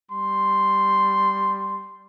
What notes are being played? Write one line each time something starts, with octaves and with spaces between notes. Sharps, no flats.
G3 C6